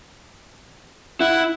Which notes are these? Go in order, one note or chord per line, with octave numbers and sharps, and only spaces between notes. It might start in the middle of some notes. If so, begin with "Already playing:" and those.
E4 F#5